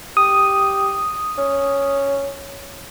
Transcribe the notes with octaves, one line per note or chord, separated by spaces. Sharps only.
G4 D#6
C#4